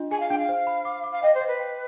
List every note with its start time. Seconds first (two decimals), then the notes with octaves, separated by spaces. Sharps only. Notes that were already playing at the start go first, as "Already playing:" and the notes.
Already playing: D4 F4 D#5
0.11 G#4 G#5
0.20 F5
0.30 D4 G5
0.39 F5
0.49 C5
0.67 B5
0.85 D6
1.04 D6
1.11 F5
1.22 D#5 G5
1.34 C5
1.41 D#5
1.47 B4
1.60 G5